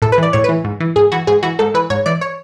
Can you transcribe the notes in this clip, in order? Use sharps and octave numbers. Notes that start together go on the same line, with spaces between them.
A2 A4
B4
E3 D5
A2 C#5
B4
E3
G#2
E3
G#2 G#4
E3 F#4
G#2 G#4
E3 F#4
G#2 A4
E3 B4
G#2 C#5
E3 D5
C#5